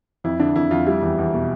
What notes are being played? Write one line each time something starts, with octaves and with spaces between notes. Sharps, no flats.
F2 E4
D3 D4
F2 E4
F2 F4
G3 E4
E2
E2
B2